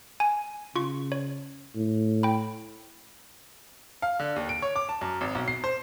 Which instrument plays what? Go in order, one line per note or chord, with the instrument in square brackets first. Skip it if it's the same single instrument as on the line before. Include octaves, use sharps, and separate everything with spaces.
[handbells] G#5
[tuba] C#3 [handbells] F4 C#6
[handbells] C#5
[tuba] A2
[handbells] G5 B5
[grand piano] F5
D3
D#2
D7
C#5
D6
A5
F#2
G#1
B1
C7
C5